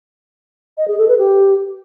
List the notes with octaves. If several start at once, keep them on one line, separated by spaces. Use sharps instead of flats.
D#5
G#4
A4
B4
G4